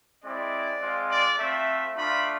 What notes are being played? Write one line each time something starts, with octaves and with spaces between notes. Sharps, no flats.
G#3 C4 E4 D5
G#3 C4 F4
D5
A3 C4 F4 E5
A3 D4 F4 B5